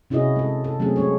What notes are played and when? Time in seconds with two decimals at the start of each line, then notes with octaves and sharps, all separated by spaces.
0.10 C3 C#4 E4 F#4 G#4 D#5
0.36 G#3 A4
0.64 A4
0.80 F#3 A3 C4 C#4 G#4
0.96 G#3 C#4 C#5